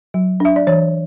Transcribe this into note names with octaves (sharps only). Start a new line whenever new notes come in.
F#3
D4 E5
D5
E3 C#5